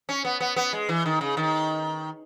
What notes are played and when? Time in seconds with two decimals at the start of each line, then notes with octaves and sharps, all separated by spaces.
0.09 C#4
0.25 B3
0.40 B3
0.56 B3
0.73 G#3
0.89 E3
1.06 D#3
1.21 C#3
1.37 D#3